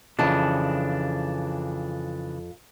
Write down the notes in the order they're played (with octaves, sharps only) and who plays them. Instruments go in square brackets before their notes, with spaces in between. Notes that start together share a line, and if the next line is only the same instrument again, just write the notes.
[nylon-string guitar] F2 A5 [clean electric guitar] C#3 E3 D4